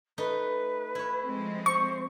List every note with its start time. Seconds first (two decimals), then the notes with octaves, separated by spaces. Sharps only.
0.18 A3 D#4 B4
0.95 E4 C#5
1.25 F3 G#3 C4
1.66 C5 C#6